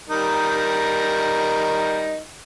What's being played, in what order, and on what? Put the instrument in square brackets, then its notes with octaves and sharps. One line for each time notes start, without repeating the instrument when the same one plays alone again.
[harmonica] G3 D#4 A#4